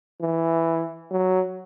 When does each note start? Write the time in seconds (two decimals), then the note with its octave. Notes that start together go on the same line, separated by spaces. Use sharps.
0.21 E3
1.10 F#3